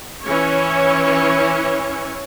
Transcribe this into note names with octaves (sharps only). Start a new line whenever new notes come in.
E3 C#4 C#5